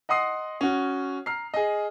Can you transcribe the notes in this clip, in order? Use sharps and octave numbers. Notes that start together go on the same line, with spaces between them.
D#5 F#5 C6 D#6 C7
C#4 F#4
A#5 F6 C7
G#4 D#5